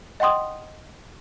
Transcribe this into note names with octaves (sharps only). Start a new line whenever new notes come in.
D#5 F#5 G5 C6 D#6